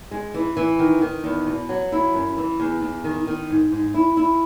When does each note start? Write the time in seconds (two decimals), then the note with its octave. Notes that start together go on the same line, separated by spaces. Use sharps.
0.11 G#3
0.34 E3
0.57 E3
0.79 D#3
1.02 D#3
1.24 E2
1.46 B2
1.69 F#3
1.92 E4
2.14 F#2
2.37 E3
2.60 E2
2.81 E2
3.04 D#3
3.27 D#3
3.50 G#2
3.72 G#2
3.94 E4
4.17 E4